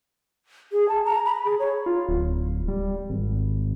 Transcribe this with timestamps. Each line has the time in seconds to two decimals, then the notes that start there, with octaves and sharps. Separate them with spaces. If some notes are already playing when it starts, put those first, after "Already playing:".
0.72 G#4
0.89 A5
1.05 A#5
1.25 B5
1.45 G#4
1.59 C#5
1.86 F4
2.09 D1
2.68 G3
3.10 G#1